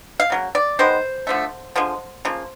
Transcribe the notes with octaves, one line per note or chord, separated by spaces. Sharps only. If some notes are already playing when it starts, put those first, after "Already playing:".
F5
C#3 F#3 A#3
D5
D#3 G#3 B3 C5
D3 F3 A3
D3 F3 G#3
C#3 F3 A#3